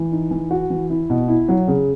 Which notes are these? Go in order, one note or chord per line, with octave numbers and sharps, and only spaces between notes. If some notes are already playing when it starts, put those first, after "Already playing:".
Already playing: E3
D#4
E3
F#4
E3
E4
B2
E4
F#3
C#3